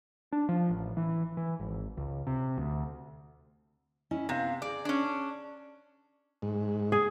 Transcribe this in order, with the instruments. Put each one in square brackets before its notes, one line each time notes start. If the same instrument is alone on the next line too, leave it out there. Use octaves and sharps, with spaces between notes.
[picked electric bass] D4
F3
A1
E3
E3
G#1
C#2
C3
D2
[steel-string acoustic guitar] C#4 E4 D#5
[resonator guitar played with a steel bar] C3 [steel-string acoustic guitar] B3 F5
[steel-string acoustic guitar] G#4 [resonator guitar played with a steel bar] D5
[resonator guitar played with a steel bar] C#4 D4
[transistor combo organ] G#2
[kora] G#4